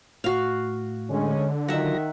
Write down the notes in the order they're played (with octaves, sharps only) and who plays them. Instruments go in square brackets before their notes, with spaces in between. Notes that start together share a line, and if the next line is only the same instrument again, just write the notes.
[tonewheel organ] A2 [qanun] F#4 F5
[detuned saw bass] D3 [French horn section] G#3 C#4
[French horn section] D#3 D#4 [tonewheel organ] F#3 F4 A#6 [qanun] E5 F#5